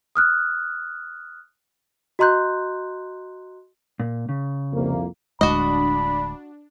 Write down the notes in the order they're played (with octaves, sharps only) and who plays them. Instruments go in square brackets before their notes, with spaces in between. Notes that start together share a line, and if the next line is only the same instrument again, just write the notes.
[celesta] D#6 F6 F#6
F#4 D#5 A#5 C6 F#6 G6
[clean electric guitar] A#2
C#3
[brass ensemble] C2 F2 A#3
[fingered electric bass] D1 D2 G#3 [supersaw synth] D4 [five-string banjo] F#4 D#5 [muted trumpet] B5